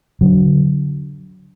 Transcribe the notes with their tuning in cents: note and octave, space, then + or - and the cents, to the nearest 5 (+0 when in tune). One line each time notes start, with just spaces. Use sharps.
D3 -25 F#3 +0